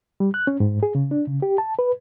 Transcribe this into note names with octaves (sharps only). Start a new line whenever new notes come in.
G3
F#6
C#4
G#2
G#4
C#3
D4
C#3
G4
A5
B4